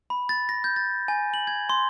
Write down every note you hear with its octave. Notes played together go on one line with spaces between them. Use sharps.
B5
A6
A#6
G6
A6
G#5
F#7
G#6
C6